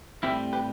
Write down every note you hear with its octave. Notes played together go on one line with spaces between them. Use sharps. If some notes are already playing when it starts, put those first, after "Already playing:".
A2 G3 C4 E4 G4
G4 B4